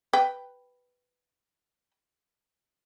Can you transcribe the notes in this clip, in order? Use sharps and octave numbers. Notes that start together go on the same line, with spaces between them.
B4 G5